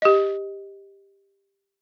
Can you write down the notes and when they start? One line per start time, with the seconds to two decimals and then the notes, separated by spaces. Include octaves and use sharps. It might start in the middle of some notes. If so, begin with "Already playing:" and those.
0.02 G4 D#5